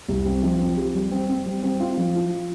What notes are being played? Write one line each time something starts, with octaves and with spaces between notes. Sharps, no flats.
C2
C4
F3
C4
G4
G3
C4
C4
G3
C4
F4
F3
F4